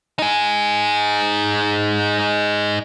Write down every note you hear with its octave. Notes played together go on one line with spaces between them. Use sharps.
D#4 G#4